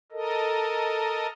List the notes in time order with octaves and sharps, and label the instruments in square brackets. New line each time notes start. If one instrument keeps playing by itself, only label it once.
[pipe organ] A4 A#4 D#5